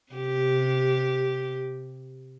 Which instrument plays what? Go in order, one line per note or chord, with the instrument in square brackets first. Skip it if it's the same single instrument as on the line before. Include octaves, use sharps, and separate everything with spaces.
[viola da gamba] C3 G4